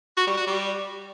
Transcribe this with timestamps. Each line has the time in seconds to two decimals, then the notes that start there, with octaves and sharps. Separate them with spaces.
0.17 F#4
0.27 G3
0.37 F#4
0.47 G3